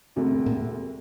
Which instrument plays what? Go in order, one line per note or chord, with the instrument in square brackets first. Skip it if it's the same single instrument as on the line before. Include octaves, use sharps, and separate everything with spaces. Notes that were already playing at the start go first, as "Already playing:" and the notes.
[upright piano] E1 D2 C3
[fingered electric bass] A#2